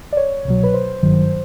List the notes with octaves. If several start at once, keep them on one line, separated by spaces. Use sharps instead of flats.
D5
C#5
C2 B2 F#3
B4
C5
G#1 G2 D#3 F#3